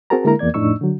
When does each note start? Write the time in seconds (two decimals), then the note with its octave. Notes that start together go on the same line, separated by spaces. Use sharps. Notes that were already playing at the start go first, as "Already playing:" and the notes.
0.10 C4 F#4 G#4 A#4 A5 A#5
0.25 D3 G#3 A#3 E4 A#4 A#5
0.39 E2 A#3 D5 G#6
0.54 F2 A2 D4 D#4 C#6 E6
0.81 D3 F#3